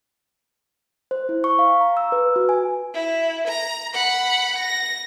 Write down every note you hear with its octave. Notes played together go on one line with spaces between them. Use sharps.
C5
E4
C#6
F5
A#5
E6
B4
F#4
G#5
E4
A#5
F#5 B5
A#6